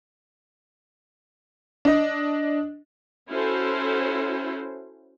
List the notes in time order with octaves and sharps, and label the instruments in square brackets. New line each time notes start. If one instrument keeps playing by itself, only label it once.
[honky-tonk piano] D4 D#5
[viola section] C#4 E4 F#4 A4 C5